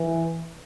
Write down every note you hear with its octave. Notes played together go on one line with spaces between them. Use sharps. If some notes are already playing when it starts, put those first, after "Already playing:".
Already playing: E3